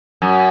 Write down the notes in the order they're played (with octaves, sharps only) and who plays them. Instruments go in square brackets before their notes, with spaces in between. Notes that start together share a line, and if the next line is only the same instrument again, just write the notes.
[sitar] F#2